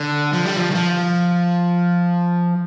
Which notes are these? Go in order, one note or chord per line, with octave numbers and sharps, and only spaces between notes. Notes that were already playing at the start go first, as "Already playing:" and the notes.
Already playing: D3
F3
G3
F3
D#3
F3